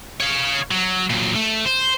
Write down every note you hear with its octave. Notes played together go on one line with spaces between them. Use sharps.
C#5 F5
F#3
A#2 F#3
A3
C5